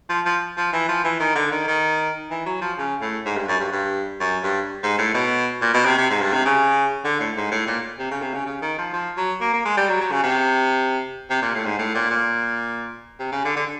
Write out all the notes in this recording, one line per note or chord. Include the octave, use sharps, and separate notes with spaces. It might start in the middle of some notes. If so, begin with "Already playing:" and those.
F3
F3
F3
E3
F3
E3
D#3
D3
D#3
D#3
E3
F#3
F3
C#3
A2
G#2
G2
F#2
G2
G2
F#2
G2
G#2
A2
B2
A#2
B2
C3
C3
G#2
G2
C3
C#3
D3
A2
G#2
A2
A#2
C3
C#3
C3
C#3
C#3
D#3
F3
F3
F#3
A#3
A#3
G#3
G3
F#3
F#3
C#3
C3
C3
A#2
A2
G#2
A2
A#2
A#2
C3
C#3
D3
D3